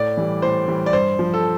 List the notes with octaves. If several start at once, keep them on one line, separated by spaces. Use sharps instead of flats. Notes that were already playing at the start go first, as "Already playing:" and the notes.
Already playing: A2 D5
E3 G3
A2 C5
E3 G3
D5
G2 C5
F3
A4